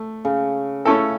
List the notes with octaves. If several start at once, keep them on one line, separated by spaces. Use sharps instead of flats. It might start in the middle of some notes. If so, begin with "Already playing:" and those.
Already playing: A3
C#3
A3 C#4 E4 A4